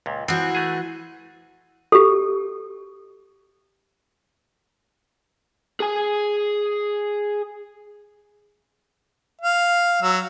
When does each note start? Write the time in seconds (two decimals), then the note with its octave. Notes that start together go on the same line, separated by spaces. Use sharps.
0.06 C#2 A#2
0.28 E3 F3 C4 F#4
0.55 A3 G#4
1.92 G4 A4
5.80 G#4 G#5
9.42 F5
10.02 F#3 E6